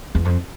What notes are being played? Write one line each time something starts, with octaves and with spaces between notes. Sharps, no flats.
E2
F2